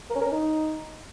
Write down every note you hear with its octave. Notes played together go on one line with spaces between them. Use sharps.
A#4
C#4
A#4
C#4
D#4